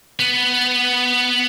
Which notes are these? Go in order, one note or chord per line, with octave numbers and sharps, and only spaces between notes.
B3